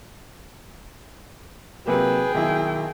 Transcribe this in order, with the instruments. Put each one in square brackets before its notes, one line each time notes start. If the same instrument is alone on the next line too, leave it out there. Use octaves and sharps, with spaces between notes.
[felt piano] C3 F#3 A#3 [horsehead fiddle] G#4 G5 [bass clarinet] B4
[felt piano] B1 E4 [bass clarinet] D#3